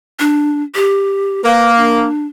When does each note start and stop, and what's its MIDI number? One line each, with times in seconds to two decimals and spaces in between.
0.19 0.63 62
0.75 1.43 67
1.44 2.05 58
1.44 1.73 71
1.77 2.26 62